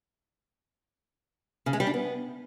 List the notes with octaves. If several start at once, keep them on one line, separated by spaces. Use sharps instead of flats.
C#3
G#3
G3
D4
B3